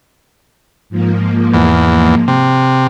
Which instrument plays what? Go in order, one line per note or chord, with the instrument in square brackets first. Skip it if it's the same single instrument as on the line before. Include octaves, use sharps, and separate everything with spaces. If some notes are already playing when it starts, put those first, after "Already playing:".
[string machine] G#2 F3 A#3
[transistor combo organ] E2
C3